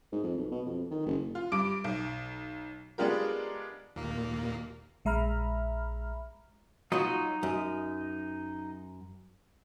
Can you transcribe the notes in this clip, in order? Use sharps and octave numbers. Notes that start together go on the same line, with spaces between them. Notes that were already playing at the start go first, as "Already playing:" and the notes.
G#2
F2
B1
B2
F2
D#3
F#1
F4
G2 D6 D7
B1
G#3 B3 D4 F4 G4 A#4
D#2 A#2 A#3
A#1 G#3 E5 A#5 B5 F6
F#3 D#4 F4 F#4 D#5
F#2